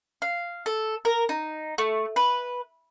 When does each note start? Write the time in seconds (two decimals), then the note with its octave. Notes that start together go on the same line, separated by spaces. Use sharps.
0.22 F5
0.66 A4
1.05 A#4
1.29 D#4
1.78 A3
2.16 B4